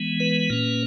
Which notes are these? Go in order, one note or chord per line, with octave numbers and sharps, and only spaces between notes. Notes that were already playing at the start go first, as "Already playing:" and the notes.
Already playing: E3 G#3 B3
B4
A#2 A#3 C#4